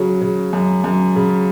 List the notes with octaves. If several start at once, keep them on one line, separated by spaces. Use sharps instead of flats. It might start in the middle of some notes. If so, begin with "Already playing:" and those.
Already playing: C#3 F#3
C#3
F#2
F#2
C#3